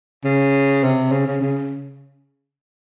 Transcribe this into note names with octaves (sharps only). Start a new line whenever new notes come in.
C#3
C3
C#3
C#3
C#3